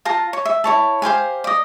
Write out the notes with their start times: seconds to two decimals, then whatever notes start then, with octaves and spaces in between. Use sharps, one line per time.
0.05 F4 A5 A#5
0.33 C#5
0.45 E5
0.64 E4 C#5 A5
1.02 G4 C5 F5 G#5
1.44 D5 D#5